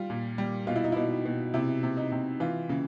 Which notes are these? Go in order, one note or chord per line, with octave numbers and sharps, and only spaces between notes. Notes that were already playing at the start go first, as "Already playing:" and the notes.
Already playing: G3 F4
A#2
G3
B2 F4
E4
D#4
B2 E4
B2
C3 E4
C3
D#4
C3
E3 F4
C#3